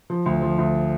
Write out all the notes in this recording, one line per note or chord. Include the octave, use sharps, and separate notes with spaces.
F3
D2
F3
D2